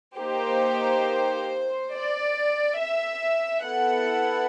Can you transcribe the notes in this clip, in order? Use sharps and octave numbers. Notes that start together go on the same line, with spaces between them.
A#3 D#4 G4 C5
D5
E5
B3 E4 A4 F#5